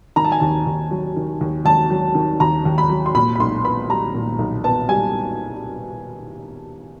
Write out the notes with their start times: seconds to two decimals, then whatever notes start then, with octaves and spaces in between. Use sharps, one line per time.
0.16 D#3 A#5
0.24 A5
0.32 G#5
0.40 D#2 A5
0.67 D#2
0.91 F#3
1.16 D#3
1.41 D#2
1.65 D#2 A5
1.90 F#3
2.15 D#3
2.40 D#2 A#5
2.65 D#2
2.78 B5
2.90 F#3
3.06 C6
3.15 A#2 B5
3.35 B5
3.40 B1 C6
3.64 B3 B5
3.89 G3 A#5
4.15 A#2
4.39 B1
4.64 B3 A5
4.89 G3 G#5